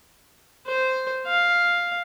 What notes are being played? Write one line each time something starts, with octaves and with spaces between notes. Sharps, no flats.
C5
F5